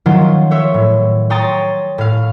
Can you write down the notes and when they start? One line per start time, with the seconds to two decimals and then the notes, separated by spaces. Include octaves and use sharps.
0.06 D#3 F3 F#3 C#4 F4 C5
0.51 C5 C#5 E5
0.74 A2
1.30 C#5 G5 A#5 C6 D#6 A6
1.98 A2 F5